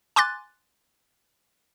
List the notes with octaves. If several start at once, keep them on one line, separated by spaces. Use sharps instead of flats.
G#5 C6 D6 F#6 A6